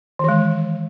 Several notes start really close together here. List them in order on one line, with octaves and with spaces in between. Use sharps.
D#3 E3 G#3